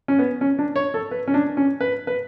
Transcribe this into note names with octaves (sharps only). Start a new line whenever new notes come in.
C#4
B3
C#4
D4
C#5
A4
B4
C#4
D4
C#4
B4
B4